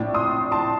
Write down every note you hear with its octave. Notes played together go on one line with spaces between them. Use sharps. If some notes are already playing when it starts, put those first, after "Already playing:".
Already playing: A#1 A2 A3 D4
C6 D#6
A5 C6